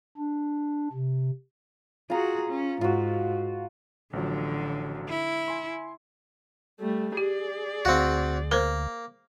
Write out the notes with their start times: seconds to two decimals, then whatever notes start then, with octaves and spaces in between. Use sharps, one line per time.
0.17 D4
0.93 C3
2.10 F4 F#4 G#4 A#5
2.49 C#4
2.81 G#2 F4 F#4
4.13 A1 D3 F3 F#3
5.09 E4
5.48 G#5 C6
6.80 G3 A3
7.17 G4 G#4 D5
7.85 D2 C4 F#4 F5
8.52 A#3 A#4 C5